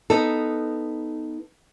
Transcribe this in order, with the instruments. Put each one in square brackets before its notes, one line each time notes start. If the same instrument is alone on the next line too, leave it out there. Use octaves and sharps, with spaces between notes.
[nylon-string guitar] B3 D#4 A4